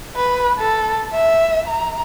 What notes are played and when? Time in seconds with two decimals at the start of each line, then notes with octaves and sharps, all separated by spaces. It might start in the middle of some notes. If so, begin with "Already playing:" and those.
0.16 B4
0.59 A4
1.12 E5
1.68 A#5